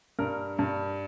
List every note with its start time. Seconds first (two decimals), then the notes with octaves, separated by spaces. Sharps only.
0.19 G2 A#4
0.59 G2